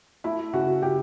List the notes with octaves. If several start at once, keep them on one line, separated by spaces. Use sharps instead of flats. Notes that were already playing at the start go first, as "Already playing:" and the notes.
A3 E4 E5
C#3 F#4 F#5
C#3 G4 G5